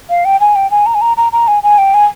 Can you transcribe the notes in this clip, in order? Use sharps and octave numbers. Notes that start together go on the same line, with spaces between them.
F5
G5
G#5
G5
G#5
A#5
G#5
A#5
A#5
A#5
G#5
G#5
G5
G#5